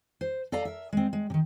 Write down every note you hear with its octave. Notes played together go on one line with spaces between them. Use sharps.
C5
A4 D5 D#5 F5 A#5
A#4 E5
G#3 C4
G#3
C3 D#3